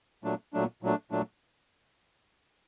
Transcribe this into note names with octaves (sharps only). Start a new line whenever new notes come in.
A#2 F#3 A3 D4
A#2 F#3 A3 D4
A#2 F#3 A3 D4
A#2 F#3 A3 D4